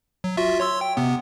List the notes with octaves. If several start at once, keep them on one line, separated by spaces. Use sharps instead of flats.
F#3
F4 F#4 E5
C#5 C6 E6
G5
C3 B3